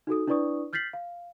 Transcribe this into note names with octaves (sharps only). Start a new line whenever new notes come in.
D#4 F#4 A4 D#6
D4 E4 B4 D5 C#6 D#6
F6 G6 A6 B6 C7 F#7
F5